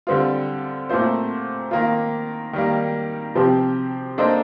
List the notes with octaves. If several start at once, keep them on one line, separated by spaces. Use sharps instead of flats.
D3 G3 C4 F4
A#2 A3 C4 F4 C5
D#3 A#3 F4
D#3 G3 A#3
C3 F3 C4 G4
A#3 D4 A4 C5 D#5